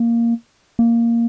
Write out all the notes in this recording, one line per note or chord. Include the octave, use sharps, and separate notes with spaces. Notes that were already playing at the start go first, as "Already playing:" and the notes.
Already playing: A#3
A#3